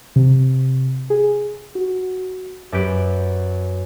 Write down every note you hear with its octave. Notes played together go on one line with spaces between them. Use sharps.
C3
G#4
F#4
F#2 G4 B4 D7